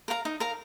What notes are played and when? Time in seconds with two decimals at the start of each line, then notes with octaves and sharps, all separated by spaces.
0.08 A#4 F5 A#5
0.25 D#4
0.40 A#4 F5 A#5